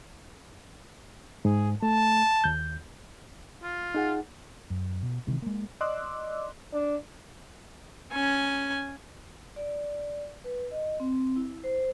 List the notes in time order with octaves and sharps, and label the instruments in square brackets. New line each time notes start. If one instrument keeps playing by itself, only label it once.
[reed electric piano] G#2 [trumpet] G#4
[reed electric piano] A3 [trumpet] A5
[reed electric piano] D#2 G6
[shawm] F4
[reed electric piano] D#4 G#4 F#5
[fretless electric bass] F#2
B2
C3 D#3 E3 G#3
G#3 A#3
[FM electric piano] D5 D#5 C6 D6 E6 F#6
[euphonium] D4
[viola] C#4 G#5
[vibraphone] D5
B4
D#5
C4
E4
C5